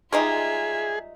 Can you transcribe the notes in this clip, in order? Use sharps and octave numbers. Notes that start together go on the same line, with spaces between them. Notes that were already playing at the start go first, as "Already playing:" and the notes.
G3 G#3 D#4 F4 G#4 E5